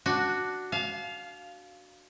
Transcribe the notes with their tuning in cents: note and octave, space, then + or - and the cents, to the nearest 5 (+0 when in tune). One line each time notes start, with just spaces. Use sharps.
D4 +0 F#4 +0
F5 +0 A5 -40